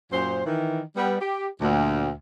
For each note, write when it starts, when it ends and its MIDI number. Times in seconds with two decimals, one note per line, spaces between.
0.12 0.41 42
0.12 0.41 46
0.12 0.41 72
0.46 0.81 51
0.46 0.81 52
0.96 1.17 55
0.96 1.17 59
1.20 1.47 67
1.61 2.11 38
1.61 2.11 46